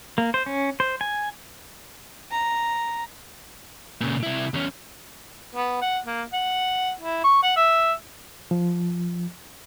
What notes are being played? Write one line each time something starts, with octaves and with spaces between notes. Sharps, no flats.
A#3
C5
C#4
C5
G#5
A#5
A#2 C#3
C3 E4
E2 C#4
B3
F#5
A#3
F#5
E4
C#6
F#5
E5
F3